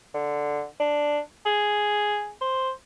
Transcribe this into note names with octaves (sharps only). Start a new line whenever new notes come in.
D3
D4
G#4
C5